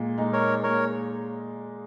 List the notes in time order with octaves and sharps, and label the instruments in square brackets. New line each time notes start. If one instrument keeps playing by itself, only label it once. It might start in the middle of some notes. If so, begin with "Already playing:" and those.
Already playing: [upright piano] A#2 G#3
G#3 D#4
[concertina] A#4 C#5
[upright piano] A#2 [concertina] A#4 C#5